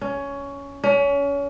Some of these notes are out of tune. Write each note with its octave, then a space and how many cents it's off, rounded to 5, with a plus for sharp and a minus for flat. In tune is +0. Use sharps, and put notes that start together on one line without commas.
C#4 +15
C#4 +30